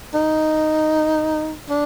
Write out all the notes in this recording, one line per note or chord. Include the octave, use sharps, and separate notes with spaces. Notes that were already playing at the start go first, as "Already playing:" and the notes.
D#4
D4